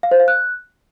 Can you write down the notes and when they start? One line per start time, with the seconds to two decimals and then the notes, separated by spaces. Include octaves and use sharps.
0.03 F5
0.11 C5
0.20 F5
0.28 F#6